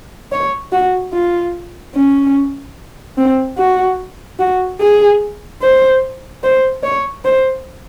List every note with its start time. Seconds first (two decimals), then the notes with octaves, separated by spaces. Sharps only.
0.32 C#5
0.72 F#4
1.13 F4
1.94 C#4
3.17 C4
3.58 F#4
4.39 F#4
4.80 G#4
5.61 C5
6.43 C5
6.83 C#5
7.24 C5